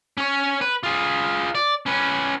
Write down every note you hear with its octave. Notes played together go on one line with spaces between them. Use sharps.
C#4 C#5
B4
F4 G#4
D5
C#4 B4